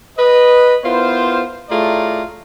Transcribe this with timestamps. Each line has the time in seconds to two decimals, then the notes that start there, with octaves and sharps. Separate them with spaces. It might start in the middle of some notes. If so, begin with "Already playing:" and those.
0.18 B4 D#5
0.84 B3 E4 F4 A#4 C5
1.70 A2 A3 F4 G#4 D5 A#5